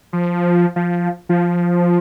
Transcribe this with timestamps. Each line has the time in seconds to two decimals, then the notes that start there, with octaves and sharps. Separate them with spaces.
0.13 F3
0.76 F3
1.29 F3